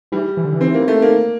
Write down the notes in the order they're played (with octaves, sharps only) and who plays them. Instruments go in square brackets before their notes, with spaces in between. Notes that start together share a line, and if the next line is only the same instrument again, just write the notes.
[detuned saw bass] E3 [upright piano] G3
[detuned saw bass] E3
D3
E3
[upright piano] C4
A#3
A3
A#3